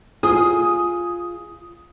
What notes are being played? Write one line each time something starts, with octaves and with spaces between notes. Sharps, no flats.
F4 G#4 D#6